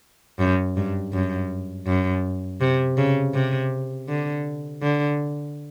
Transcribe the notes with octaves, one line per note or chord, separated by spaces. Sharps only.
F#2
G2
F#2
F#2
C3
C#3
C3
D3
D3